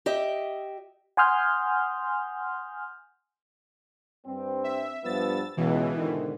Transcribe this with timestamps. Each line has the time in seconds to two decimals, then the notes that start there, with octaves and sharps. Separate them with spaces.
0.06 G4 D#5 E5
1.17 F#5 G#5 C6 D#6 F6 G6
4.26 G2 C4
4.64 E5
5.04 G2 F3 B3 E6 A6
5.57 C#2 B2 E3
5.97 G#2 D3 D#3